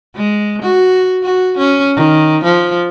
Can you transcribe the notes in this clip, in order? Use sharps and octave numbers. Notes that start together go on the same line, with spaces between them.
G#3
F#4
F#4
C#4
D#3
F3